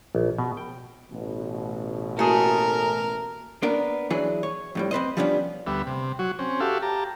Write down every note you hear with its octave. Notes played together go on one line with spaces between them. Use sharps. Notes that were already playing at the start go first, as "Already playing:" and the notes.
A#1
B2
G5
A1 B2
A3 A#3 F#4 G#4 A#4
A#3 B3 D4 A#4
E3 F#3 D4 G#4
C#5
F2 A2 G3
C4 B4 C5 D#5
F3 G3 B3 C#4 D4
D2 G3 B3 E5
C3
F#3 F#4
C4 C#4
F#4 G4 A4 E5 F5
G4 A5 A#5